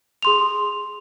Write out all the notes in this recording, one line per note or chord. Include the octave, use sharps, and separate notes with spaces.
G#4 C6 F7